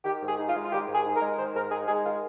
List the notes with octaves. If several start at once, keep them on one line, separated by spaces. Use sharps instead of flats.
D#3 G4
G#2
G#4
D#4
F4
G#3
F4
D#3 G4
G#2
G#4
D#4
A#4
G#3
D#3 C5
G#2 A#4
D#4 G#4
G#3 G#4
D#3 F4